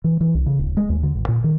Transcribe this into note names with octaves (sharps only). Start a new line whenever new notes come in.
E3
E3
C2
C#3
D1
G#3
D#2
D3
A1
A#2
D#3